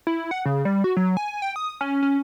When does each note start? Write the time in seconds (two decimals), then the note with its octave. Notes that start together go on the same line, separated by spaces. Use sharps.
0.07 E4
0.31 F#5
0.46 C#3
0.65 G3
0.84 F#4
0.97 F#3
1.17 G#5
1.42 G5
1.56 D#6
1.81 C#4
2.03 C#4